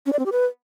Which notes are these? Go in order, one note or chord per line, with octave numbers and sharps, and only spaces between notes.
C#4
D5
C4
G4
B4